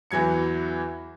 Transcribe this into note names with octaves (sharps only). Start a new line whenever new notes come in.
E2 E3 F#3 G#6 C#7